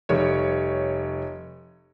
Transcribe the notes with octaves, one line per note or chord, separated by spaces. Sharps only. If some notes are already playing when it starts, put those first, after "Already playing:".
F1 G3 C#5